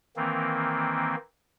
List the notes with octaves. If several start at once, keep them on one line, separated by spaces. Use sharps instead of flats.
D#3 E3 A#3 C4